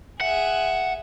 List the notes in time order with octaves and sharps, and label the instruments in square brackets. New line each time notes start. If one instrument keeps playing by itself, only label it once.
[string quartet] G#4 E5 [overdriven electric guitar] F#5